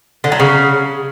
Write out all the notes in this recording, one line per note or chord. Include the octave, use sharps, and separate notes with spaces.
D3
F#3
C#3